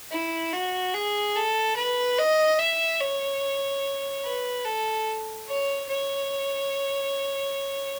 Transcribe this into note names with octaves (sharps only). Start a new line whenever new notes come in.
E4
F#4
G#4
A4
B4
D#5
E5
C#5
B4
A4
C#5
C#5